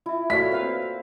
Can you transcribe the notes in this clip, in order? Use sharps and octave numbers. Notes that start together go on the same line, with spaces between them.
E4 F4 E5
A3 F4 F#4 C#5 D5 E5 B6
A#3 C4 B4 F5